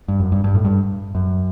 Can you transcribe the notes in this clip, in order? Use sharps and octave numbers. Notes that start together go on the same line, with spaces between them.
G2
F#2
G2
G2
A2
G2
F#2